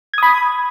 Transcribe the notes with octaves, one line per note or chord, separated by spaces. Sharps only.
B5 D#6 G#6